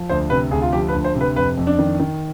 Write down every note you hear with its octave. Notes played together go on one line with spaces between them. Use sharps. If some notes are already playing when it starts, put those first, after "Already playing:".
Already playing: F3
D2 C5
C3 B4
D2 G#4
F4
F3 G4
B4
D2
C5
C3
B4
F2 B4
F2
D4
D#3
D#3